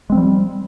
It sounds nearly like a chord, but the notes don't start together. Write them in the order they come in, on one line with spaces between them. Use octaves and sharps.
G#3 C4 F3 G3